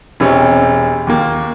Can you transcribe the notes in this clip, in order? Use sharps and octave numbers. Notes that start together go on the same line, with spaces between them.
E1 C3 C4 C#4
D#2 A#3